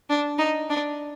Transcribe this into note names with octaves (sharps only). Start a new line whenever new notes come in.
D4
D#4
D4